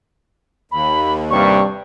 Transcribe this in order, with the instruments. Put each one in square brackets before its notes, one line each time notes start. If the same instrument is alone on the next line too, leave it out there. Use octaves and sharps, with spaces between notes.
[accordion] D#2 [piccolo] B5
[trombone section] G2 C3 G3 [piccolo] C#6